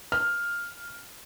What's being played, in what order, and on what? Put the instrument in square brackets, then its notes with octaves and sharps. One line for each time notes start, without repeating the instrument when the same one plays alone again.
[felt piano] F6